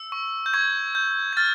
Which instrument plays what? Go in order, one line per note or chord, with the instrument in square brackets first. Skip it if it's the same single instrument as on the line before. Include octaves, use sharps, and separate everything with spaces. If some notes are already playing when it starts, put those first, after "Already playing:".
Already playing: [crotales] E6
C#6
G6
C#6 G#6
G6
G#6
F6 A6